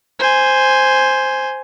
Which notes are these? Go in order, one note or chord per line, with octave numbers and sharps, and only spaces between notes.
C5 G#5